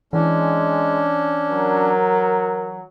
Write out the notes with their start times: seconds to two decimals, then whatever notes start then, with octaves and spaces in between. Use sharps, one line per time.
0.13 E3 G#3 C#4 D4
1.51 F#3 A#4